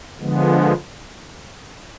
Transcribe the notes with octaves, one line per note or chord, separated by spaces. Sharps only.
D3 F3 G#3 B3